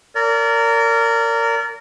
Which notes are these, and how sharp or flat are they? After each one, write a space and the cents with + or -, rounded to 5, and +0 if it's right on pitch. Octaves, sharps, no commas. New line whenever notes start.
A#4 -20 D5 -35